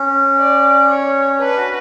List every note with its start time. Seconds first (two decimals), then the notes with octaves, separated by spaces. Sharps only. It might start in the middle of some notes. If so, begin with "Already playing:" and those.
Already playing: C#4
0.38 D5
0.89 C#5
1.40 D4 B4
1.57 F#4